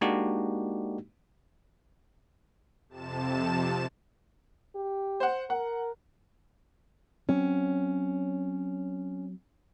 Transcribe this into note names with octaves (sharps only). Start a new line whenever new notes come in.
G#3 A#3 D4 D#4 F#4 G4
F2 C3 A5 E7
G4
C5 F#5
A#4 F#5
F#3 C4 C#4